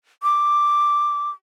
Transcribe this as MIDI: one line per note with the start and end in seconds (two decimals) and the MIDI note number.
0.23 1.30 86